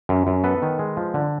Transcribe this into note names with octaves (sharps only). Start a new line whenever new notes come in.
F#2
F#2
B3 A4 B4
D#3
G#3
F3
D3